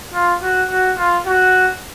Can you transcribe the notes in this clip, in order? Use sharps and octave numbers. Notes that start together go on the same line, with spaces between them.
F4
F#4
F#4
F4
F#4